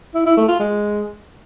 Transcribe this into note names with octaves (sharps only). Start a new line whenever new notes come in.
E4
E4
A3
F4
G#3